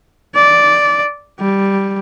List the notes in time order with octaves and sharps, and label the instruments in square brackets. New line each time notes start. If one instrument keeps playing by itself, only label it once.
[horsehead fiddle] D5
G3